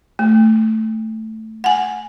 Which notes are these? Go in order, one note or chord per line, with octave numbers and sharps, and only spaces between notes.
A3
F#5 G#5